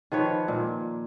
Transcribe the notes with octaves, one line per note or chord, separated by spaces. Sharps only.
D#3 F3 B4 C#5
A#2